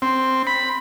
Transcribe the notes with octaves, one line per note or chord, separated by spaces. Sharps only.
C4
B5